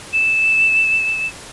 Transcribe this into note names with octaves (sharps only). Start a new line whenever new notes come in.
E7